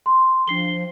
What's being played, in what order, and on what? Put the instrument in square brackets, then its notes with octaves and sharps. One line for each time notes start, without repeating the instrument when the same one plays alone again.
[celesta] C6
[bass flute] F3 [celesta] D4 C7 G7